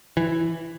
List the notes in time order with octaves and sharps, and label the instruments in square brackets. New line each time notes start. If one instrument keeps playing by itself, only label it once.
[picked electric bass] E3